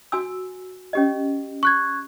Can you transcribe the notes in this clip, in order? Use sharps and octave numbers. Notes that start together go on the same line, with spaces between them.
F#4 G#5 E6
C#4 G4 D#5
C#6 F#6 G#6